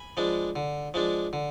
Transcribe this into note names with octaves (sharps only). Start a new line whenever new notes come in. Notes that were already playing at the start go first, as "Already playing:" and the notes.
Already playing: G#5 B5
F3 G#3 D4
D3
F3 G#3 D4
D3